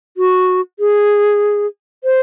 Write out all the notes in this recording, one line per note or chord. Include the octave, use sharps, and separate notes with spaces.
F#4
G#4
C5